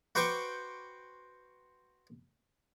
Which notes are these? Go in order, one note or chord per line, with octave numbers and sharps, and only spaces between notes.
F#4 B4 C5 G5 C#6 D6